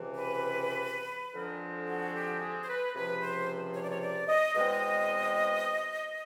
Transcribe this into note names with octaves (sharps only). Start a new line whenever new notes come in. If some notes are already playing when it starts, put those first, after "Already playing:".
Already playing: C#2 C3 E3
B4
F2 D3 F3 G#3 C4 A#4
F#4
G4
G#4
C5
B4
C#2 C3 F3 B4
C5
C#5
D5
C#5
D5
D#5
E2 B2 G#3 C4 D#5